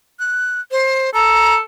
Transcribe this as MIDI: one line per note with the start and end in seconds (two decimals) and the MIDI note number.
0.19 0.60 90
0.71 1.10 72
1.14 1.59 69
1.14 1.55 82